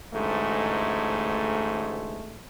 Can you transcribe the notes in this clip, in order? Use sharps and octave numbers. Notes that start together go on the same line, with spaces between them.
A1 D2 G#2 G#3 A3